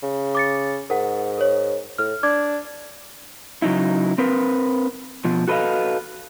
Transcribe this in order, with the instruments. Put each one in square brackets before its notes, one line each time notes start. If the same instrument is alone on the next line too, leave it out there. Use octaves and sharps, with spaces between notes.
[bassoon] C#3
[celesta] D6 A6 C#7
[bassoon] G#2 [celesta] A#4 F#5
[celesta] A#4 C#5
[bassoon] A2 [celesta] F6
[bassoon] D4 [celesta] D6 G#6
[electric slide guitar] C#3 F#3 D#4 E4
C4 A#4 B4
B2 F3
F#4 A4 B4 C5 D#5 F5